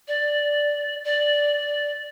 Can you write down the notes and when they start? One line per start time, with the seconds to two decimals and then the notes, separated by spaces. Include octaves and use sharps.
0.08 D5
1.04 D5